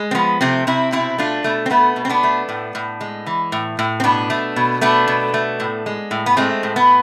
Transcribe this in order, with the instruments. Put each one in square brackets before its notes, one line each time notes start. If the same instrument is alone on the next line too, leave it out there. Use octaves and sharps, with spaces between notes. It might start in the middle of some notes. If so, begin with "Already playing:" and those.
Already playing: [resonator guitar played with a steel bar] G#3
C4
F3 B3
C3 A3 C4
C3 C4 E4
B2 C4 E4
A3 D4 F4
B2 A3
C4
A3 B3
B2
C4
B3 D4
A3
A2
A2
G#3
E3
A2
A2
C4
B2 B3 D4
A3
B2
A3 B3 D4
B2
A3
A2
G#3
A2
B3
G#3 A3 C4
A2
B3